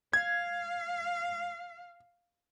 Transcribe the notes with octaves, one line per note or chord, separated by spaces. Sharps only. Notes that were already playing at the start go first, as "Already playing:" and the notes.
F5 G#6